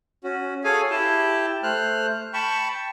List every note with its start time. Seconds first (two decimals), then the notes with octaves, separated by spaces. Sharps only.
0.24 C#4 F#4
0.64 G#4 A4 C#5 F5 G#5
0.91 E4 G4 G5 A5
1.63 A3 C5 F6 F#6
2.33 G5 A5 B5 C#6